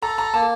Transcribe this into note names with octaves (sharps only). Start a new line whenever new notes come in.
A4 A#5
A#5
A#3 A5